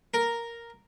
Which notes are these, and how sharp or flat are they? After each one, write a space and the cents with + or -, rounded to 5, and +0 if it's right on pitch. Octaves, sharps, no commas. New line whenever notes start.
A#4 +0